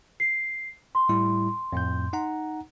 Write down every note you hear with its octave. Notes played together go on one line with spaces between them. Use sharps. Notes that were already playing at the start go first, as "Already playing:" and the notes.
C7
C6
A2 G3 E4
F2 A2 G6
D#4 F#5 A#5